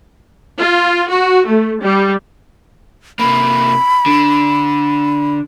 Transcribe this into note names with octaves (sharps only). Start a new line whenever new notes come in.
F4
F#4
A3
G3
C3 A#3 B5
D3